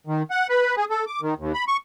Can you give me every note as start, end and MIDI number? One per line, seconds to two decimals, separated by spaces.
0.07 0.23 51
0.31 0.47 78
0.49 0.75 71
0.77 0.85 68
0.90 1.05 69
1.07 1.20 86
1.22 1.34 51
1.38 1.53 39
1.54 1.64 83
1.68 1.77 85